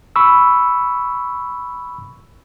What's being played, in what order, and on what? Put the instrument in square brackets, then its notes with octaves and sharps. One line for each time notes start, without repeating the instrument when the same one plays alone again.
[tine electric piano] B5 C#6 E6